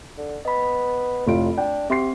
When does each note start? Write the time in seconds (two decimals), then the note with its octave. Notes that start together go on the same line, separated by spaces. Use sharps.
0.18 D3
0.45 B3 D#5 B5
1.27 F1 A2 F4 D7
1.57 D4 G5
1.90 C4 G4 E5 C6 C7